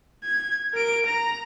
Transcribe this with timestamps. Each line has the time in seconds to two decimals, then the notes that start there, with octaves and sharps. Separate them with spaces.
0.23 G#6
0.73 A#4 D7
1.06 A#5